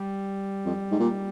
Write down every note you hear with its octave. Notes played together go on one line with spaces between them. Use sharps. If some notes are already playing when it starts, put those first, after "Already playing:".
Already playing: G3
F2
G#2
A#2